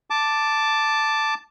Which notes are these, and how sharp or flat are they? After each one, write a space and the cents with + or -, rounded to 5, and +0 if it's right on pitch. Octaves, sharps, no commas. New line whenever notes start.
A5 +0 D6 +0